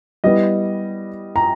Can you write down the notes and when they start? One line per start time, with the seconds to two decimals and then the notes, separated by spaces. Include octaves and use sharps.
0.24 G3 B3 E4 D#5
1.36 A#5